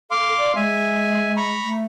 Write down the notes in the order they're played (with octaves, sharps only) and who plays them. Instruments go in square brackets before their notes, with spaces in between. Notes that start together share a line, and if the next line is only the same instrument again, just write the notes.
[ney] A4 [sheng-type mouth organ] F5 C6 D6
[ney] D5
[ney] G#3 [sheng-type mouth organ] E5 G#5
[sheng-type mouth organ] A#5 B5 C#6
[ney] A3